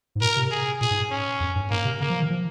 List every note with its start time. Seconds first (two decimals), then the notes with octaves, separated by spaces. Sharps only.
0.15 G#2
0.21 A#2 A#4
0.36 C3
0.51 G#4
0.81 A#2 G#4
0.91 G#2
1.11 C#4
1.40 F2
1.55 G2
1.70 G#2 A#3
1.85 C3
2.00 C#3 A#3
2.10 F3
2.20 D#3
2.30 F3